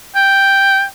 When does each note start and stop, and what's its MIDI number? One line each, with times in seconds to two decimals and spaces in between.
0.15 0.84 79